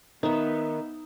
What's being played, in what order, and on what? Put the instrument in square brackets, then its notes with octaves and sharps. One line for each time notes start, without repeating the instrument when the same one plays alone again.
[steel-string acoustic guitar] D#3 [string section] B3 [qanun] D#4 E5